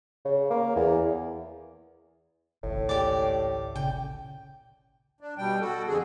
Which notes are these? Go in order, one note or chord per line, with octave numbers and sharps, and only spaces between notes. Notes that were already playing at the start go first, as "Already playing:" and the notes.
C#3
A#3
E2
G#1 C#2 A2
G4 D5
A#2 C#3 G5
D4
B2 G3 G5
F#4 A4
F2 D3 G#4